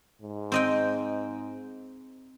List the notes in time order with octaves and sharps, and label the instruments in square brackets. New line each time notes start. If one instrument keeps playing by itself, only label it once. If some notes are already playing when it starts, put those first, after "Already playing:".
[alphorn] G#2
[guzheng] C4 D#5 G5